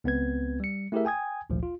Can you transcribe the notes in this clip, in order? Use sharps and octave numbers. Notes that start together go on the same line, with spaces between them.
C#2 B3 C4 B4 G#6
G3 C#7
A3 E4 G4 G#4 A#4 E5
G5 G#5 D#6 G#6
G#1 D2 A#2 F3
F4